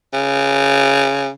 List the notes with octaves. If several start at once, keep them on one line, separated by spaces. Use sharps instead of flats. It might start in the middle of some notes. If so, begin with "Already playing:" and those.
C#3